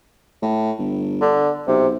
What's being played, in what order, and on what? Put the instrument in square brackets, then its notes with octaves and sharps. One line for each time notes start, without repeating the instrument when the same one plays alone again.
[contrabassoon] A2
G1
[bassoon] D3
[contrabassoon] B1 [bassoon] C3